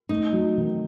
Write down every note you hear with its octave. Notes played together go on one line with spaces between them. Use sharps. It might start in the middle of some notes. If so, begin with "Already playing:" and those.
A3 D#4
F#3
D#3